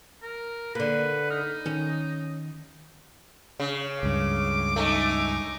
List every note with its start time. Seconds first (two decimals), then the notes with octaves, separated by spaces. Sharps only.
0.23 A#4
0.75 D3 A#3 B4
1.31 D#4 F6
1.66 D#3 C#4
3.60 C#3
4.03 C#2 G2 D6
4.76 A3 D#4 G#5